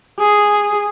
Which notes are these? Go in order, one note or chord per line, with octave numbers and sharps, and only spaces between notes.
G#4